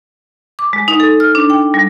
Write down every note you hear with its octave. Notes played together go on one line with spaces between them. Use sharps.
D6
G#3
D#4
A4
F6
D4
G5
G3